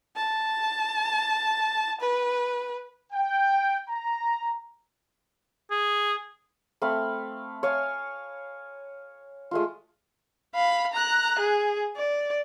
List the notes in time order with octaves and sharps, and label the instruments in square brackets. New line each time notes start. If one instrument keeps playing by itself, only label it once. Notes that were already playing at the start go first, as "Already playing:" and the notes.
[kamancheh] A5
B4
[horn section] G5
A#5
[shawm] G#4
[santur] A3 C4 F5 B5
C#5 F5 G#5
G#3 A3 F4
[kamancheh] F5 B5
A#5 F#6
G#4
D5